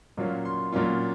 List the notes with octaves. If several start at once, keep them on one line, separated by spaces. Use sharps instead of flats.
A#2 F#3 A#3 C#4 F4
C6
A#2 F#3 A#3 C#4 F4 C6